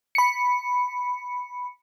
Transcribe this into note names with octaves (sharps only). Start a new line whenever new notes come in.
B5 C#7